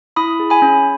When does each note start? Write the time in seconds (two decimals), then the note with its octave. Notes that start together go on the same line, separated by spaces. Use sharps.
0.16 E4 B5 D#6
0.40 G#4
0.50 G#5 B5
0.62 C#4